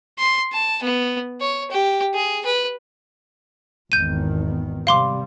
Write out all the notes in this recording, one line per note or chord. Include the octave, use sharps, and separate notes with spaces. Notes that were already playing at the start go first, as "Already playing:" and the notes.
C6
A5
B3
C#5
G4
G#4
B4
G#1 E2 D#3 G6 D#7
C3 G3 F5 C6 D6